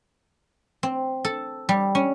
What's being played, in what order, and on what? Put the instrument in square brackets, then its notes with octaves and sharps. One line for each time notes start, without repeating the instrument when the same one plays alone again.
[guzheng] C4
A4
G3
C#4